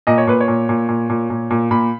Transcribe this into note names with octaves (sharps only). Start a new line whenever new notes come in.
A#2 D#5
C#5
A#2 B4
C#5
A#2
A#2
A#2
A#2
A#2
A#2
A#2 B5